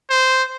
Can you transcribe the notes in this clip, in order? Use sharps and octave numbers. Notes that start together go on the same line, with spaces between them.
C5